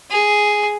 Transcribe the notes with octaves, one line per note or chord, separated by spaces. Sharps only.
G#4